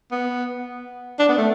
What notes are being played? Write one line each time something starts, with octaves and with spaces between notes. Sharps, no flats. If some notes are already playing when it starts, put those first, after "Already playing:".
B3
D4
B3
A3